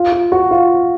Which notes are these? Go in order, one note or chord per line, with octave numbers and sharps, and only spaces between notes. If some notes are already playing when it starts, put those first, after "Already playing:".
Already playing: F4
F4
F#4
F4